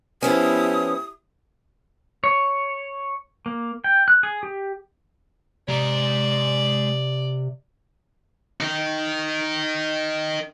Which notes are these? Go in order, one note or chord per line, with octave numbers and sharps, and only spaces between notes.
F3 B3 C#4 E4 G4 D#6
C#5
A#3
G5
F#6
G#4
G4
C3 G#3 D5 A#5
D#3 D#4